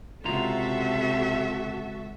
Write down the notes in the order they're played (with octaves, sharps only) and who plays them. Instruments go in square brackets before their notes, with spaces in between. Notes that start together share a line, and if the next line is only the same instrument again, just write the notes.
[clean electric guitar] C#2 F4 A#5 [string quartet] C3 [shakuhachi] F#4 [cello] A4 E5